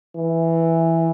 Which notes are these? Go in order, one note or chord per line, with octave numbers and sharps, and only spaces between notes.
E3